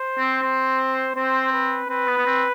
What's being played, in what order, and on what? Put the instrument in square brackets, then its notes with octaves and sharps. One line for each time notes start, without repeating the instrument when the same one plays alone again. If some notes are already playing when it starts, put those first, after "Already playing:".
Already playing: [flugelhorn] C5
[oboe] C4
C4
[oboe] C4 [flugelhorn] C5
[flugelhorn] B4
[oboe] C4 [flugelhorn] B4
[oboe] B3
B3
C4